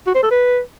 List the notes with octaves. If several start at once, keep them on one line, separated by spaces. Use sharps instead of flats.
F#4
C5
A4
B4